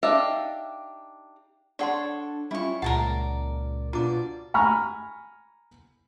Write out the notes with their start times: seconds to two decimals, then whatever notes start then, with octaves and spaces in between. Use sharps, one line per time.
0.03 D4 D#4 G4 E5 F5
1.79 D4 A4 C#5 D5 F#5 C6
2.51 G3 C#4 E4 F4 C#6
2.82 C#2 A#2 A#4 D5 F#5 A5
3.93 B2 D4 F4 D5 A#5 D6
4.54 G#5 A#5 B5 C#6 F6